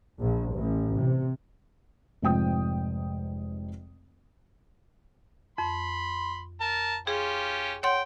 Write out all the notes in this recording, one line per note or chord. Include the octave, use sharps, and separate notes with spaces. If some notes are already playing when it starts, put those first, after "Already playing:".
A#1
A1
C3
F1 G#2 F3 G5 D#6
F2 B5 C6
A#4 A5
C#4 F4 G4 G#4
C#5 F#5 G5 C6